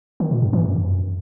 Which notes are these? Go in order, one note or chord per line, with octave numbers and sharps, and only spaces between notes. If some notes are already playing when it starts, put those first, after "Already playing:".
D#3
A#2
G2
E3
F#2